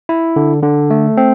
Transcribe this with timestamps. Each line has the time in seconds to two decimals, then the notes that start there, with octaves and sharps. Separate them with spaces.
0.09 E4
0.36 D3
0.63 D3
0.90 A3
1.17 C4